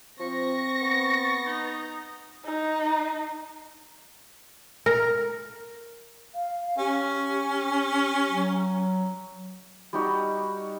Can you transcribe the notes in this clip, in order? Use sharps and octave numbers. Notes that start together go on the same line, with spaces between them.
F3 C4 C#6 A#6
B3
D#4
D#4
A#4
F5
C#4 G4
F#3
G3 D#4 F#4